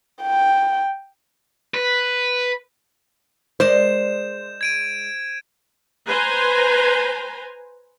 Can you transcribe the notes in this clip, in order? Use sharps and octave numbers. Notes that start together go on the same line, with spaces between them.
G5
B4
G#3 A#4 C5 D5 G6 E7
G#6 D7 D#7
B4 C5 G#5 A#5